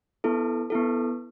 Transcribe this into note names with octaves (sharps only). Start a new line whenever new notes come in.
B3 E4 A4
B3 E4 A4